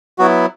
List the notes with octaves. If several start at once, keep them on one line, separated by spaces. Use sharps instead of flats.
F#3 B3 E4 F#4